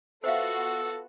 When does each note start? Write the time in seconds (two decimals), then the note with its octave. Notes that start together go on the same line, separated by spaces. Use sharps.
0.24 B3 F4 F#4 A4 C5 E5 F5